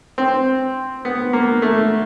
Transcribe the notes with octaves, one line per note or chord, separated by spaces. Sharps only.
C4
B3
A#3
A3